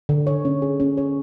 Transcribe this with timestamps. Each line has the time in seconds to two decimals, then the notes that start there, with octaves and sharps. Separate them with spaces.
0.09 D3
0.27 C#5
0.45 C#4
0.62 G#4
0.80 C#4
0.97 C#5